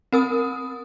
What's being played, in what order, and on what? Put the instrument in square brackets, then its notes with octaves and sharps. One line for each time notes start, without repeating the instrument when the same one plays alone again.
[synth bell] C4 A#4 D#6